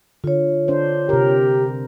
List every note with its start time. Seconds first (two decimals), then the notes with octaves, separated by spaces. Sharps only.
0.24 D3 F4 C#5
0.68 D4 C5
1.09 C3 G4 A#4